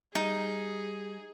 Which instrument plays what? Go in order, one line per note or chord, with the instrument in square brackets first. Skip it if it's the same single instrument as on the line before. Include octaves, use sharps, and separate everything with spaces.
[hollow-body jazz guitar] G3 [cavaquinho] D#4 [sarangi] G#4